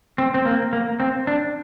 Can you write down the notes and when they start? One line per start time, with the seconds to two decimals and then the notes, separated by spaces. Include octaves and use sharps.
0.18 C4
0.34 C4
0.45 A#3
0.73 A#3
1.00 C4
1.27 D4